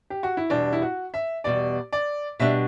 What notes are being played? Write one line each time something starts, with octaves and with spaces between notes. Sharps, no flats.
G4
F#4
E4
E2 B2 G3 D4
E4
F#4
E5
E2 B2 G3 D5
D5
B2 G3 D4 E5